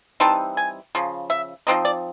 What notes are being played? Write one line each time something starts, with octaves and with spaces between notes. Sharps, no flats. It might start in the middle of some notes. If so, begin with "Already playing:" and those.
E3 G3 C4 D#4 A5
G#5
C#3 F3
E5
F3 A3 C4 D#4 D#5
D5